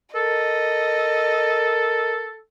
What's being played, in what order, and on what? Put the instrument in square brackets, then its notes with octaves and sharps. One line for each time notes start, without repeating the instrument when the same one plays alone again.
[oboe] A4 [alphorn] A#4 [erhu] D#5